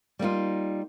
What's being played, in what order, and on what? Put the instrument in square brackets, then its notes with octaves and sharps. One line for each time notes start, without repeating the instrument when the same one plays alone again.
[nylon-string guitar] G3 A#3 D#4 F4